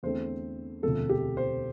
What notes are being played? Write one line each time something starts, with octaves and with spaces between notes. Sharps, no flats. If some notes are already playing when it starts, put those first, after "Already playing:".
E2 D3 A3 C4 C5
E1 D2 C3 F3 A3 A4
G4
C5